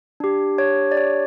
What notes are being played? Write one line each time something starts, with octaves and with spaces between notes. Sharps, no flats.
D4 G4
C#5
D5
C#5